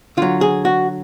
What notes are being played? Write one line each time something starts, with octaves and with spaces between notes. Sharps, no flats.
D3 F#3 F4
G#4
F#4